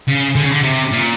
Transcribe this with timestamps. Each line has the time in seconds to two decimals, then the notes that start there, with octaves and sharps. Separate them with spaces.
0.08 C#3
0.36 D3
0.44 C#3
0.51 D3
0.63 C3
0.92 A#2